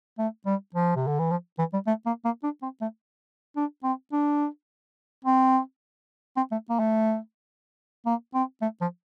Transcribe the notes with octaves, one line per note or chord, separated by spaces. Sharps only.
A3
G3
F3
C3
D3
E3
F3
E3
G3
A3
A#3
A#3
D4
C4
A3
D4
C4
D4
C4
C4
A3
A#3
A3
A#3
C4
A3
F3